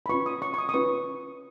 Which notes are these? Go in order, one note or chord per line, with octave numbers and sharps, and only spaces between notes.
B5
C#4 F4 B4 C#6
D#6
C#6
C#6
D#6
D#6
C#4 F4 B4 C#6